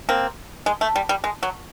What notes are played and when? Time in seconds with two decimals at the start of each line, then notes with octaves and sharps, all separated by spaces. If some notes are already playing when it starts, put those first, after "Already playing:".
0.09 A#3 C4
0.66 G#3
0.81 A3
0.96 G3
1.09 G3
1.24 G#3
1.43 F#3